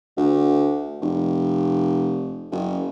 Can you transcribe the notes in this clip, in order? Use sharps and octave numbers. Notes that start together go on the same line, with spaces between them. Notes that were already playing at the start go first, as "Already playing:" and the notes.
D2
F1
F#1